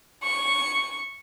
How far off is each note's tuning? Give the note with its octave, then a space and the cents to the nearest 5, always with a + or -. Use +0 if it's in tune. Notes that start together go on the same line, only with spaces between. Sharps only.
C#6 -5